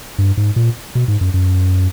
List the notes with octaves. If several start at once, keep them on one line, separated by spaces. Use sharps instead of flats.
G2
G#2
A#2
B2
G#2
F#2
F#2